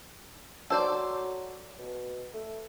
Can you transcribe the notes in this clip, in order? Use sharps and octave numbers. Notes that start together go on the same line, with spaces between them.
F#3 A4 C5 D5
B2
A3